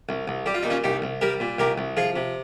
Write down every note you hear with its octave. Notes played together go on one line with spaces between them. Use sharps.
C2
C2
G3 G4
F4
A#2 D#4
C#4 F4
C2 D#4 G4
C2
G3 G4 A#4
A#2
C2 G4 A#4
C2
F3 F4 G#4
C3